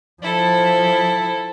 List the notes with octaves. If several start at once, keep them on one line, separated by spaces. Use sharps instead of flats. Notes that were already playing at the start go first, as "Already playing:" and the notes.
F3 E4 A4